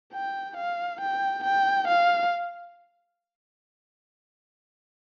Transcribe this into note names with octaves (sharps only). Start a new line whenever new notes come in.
G5
F5
G5
G5
F5